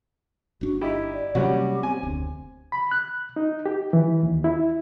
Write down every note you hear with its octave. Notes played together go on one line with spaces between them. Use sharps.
G1 D4 F#4
D#4 E4 G4 D#5
D5
C3 F#3 G3 A#3 C#4 F#4 G4
B3 C4 G#5
F1 D2
B5
F#6
D#4
G4
E3
D#2
E4